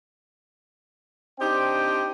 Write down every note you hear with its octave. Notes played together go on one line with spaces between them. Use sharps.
C4 D4 D#4 G4 C5 G5